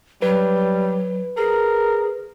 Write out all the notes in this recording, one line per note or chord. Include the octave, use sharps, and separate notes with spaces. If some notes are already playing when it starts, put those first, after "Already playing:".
F#3 G3 B4
G#4 A#4